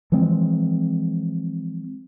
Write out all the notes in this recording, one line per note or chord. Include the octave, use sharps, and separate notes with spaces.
E3 F3 G#3 C4